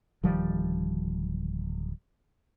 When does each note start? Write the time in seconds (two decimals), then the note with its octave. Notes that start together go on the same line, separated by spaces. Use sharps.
0.23 D1 D#3 F3 G3